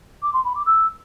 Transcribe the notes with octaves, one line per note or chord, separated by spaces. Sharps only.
D6
C6
B5
D6
E6